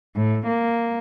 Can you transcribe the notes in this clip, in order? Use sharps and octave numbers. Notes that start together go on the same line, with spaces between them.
A2
A#3